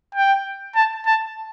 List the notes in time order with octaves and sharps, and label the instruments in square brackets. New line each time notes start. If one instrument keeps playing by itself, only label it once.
[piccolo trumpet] G5
A5
A5